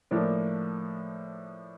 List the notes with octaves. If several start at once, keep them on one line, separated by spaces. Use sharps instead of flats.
A2 F3 A#3 D4